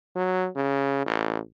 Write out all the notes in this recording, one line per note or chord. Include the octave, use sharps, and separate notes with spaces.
F#3
C#3
A1